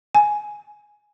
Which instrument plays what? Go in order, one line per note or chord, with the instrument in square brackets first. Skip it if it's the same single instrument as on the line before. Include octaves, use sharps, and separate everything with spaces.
[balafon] G#5